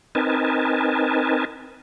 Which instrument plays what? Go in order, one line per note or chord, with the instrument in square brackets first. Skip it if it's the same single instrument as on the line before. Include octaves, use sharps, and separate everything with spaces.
[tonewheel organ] C4 D#4 A#4 B4 G#5 A5